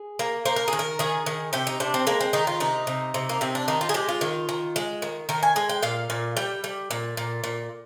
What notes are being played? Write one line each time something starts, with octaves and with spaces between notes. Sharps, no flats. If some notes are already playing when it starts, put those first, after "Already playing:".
Already playing: G#4
A#3
A#3 C5
A#4
D#3 G#4
A#4
D#3 G#4
D#3
C3 G4
D#4
C3 D4
C4
G#3 A#3
C4
D#3 D#4
F4
C3 D#4
C3
C3
A#3
C3 C4
D4
D#3 D#4
F4
G#4
G#3 G4
F4
D#3
D#3
G#3
D#3
D#3 A#4
G#5
G#3 G#5
G5
A#2 F5
A#2
G3 G5
G3
A#2
A#2
A#2